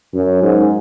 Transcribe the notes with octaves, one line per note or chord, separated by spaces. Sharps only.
F#2
G#2